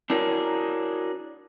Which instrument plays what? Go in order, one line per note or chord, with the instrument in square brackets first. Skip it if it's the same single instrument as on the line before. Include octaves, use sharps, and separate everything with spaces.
[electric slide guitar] D4 E4 F#4 G#4 A#4 C#5